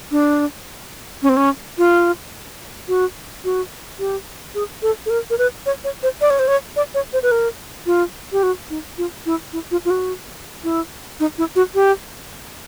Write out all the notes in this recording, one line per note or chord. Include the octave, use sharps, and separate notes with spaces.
D4
C#4
C4
C#4
F4
F#4
F#4
G4
G#4
A4
A4
A#4
A#4
B4
C#5
C#5
C5
D5
C#5
C5
C#5
D5
C#5
C5
B4
A#4
F4
G4
F#4
D#4
F4
E4
E4
F4
F4
F#4
E4
D#4
E4
F#4
G4